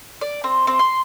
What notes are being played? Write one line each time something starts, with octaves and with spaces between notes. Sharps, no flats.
D5
C4
C4
C6